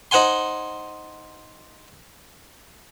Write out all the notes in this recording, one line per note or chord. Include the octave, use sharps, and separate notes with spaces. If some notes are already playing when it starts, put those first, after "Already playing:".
D#4 C5 F#5 G#5 C6